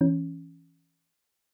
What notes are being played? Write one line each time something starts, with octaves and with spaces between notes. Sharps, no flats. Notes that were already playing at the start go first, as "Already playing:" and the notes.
E3 C#4